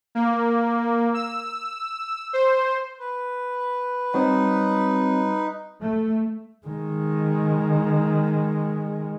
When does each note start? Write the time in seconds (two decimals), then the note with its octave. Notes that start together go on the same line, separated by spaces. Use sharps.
0.15 A#3
1.14 E6
2.33 C5
3.00 B4
4.14 G3 C4 D#4 F#4 C#5
5.81 A3
6.67 D#3 G#3